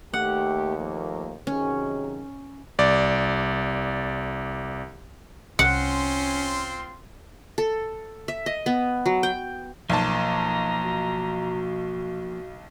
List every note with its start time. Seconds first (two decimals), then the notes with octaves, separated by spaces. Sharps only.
0.14 D#2 A3 G4 F#5
0.76 F3 A3 A#3
1.47 C3 D#3 F#3 C#4 G#4
2.79 C2 D5
5.59 C2 C4 C#4 F4 F#5 C6
7.58 A4
8.28 E5
8.46 D#5
8.66 B3
9.06 F#3
9.23 G5
9.89 B1 F3 A#3 C5 A5 A#5
10.84 F#4